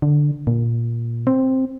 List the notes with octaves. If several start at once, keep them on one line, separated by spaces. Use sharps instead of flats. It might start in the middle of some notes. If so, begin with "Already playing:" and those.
D3
A#2
C4